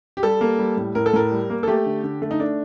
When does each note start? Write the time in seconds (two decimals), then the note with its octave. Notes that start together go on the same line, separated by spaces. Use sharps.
0.17 G4
0.23 G3 A4
0.41 A#3
0.59 G3
0.77 A2
0.95 A2 A#4
1.06 A4
1.13 A2 A#4
1.31 G3
1.50 A#3
1.63 A4
1.68 A3 G4
1.86 D3
2.04 D3
2.22 A3
2.31 D#4
2.40 A3 D4